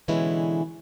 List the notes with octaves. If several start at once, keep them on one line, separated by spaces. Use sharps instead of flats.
B2 D3 E3 G#3 C#4 E4